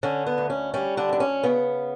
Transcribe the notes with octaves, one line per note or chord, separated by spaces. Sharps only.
D3 C#4
B3
D2
C#4
G3 C#4
D3 D4
D2 D4
C#4
C#3 B3